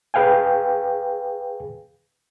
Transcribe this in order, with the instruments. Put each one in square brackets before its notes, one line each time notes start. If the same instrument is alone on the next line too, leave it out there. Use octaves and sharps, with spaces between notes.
[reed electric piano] G#4 B4 F5 G5 G#5